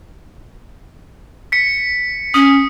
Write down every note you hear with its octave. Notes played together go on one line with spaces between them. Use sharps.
B6 C#7
C#4 D#6